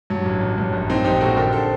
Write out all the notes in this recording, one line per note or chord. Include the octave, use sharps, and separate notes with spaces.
G2 F#3
A1
A1
G2
A#1
A#2 C4 D#4
A#1 D#4 G4
A#2 F#4 A4
D3 G4 A#4
A4 C5